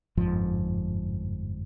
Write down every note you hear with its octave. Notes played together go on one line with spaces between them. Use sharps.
G1 F2 G#2 F3